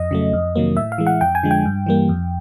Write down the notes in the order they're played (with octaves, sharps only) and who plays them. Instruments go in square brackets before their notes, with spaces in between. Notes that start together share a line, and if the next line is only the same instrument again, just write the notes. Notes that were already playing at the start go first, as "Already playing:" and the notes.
Already playing: [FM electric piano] F2 D#5
C#3 F#3 A3
F2
C3 D#3 F#3 A#3
A2 E5
F5
E3 G#3
F#5
F2 G5
G#5
D3 F3 G#3
G5
G2
E3 G3 A#3
F2